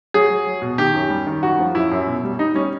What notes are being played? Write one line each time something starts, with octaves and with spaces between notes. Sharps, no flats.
F#3 G#4
F#3
F#3
B2
D#3 G4
F#2
G3
D#3
F#2 F#4
F3
F#2 E4
F#2
B2
G3
G3 D#4
G3 C#4